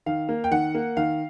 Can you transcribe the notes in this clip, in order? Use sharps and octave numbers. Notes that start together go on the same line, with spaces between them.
D#3 F5
A#3
G5
D#3 F#5
A#3
D#3 F5